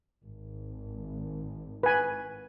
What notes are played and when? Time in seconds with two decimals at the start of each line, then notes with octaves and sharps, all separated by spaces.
0.23 G#1
1.83 B4 G#5